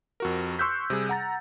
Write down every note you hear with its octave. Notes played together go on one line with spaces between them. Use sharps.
F2 F#4 A#4
C6 C#6 E6 F#6 G6 B6
C3 G3 G#4
F#5 A#5 A6